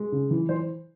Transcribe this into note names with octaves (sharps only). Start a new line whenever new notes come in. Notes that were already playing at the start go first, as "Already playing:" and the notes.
Already playing: G#3 G#4
C#3
E3
E3 C5